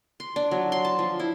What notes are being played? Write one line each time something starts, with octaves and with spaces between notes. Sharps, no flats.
C6
D4
F#3
C6
A5
F3
E4